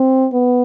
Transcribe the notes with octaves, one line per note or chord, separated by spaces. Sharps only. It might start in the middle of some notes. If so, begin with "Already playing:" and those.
Already playing: C4
B3